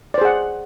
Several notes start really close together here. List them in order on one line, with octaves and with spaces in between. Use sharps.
D5 C5 G#4 F#5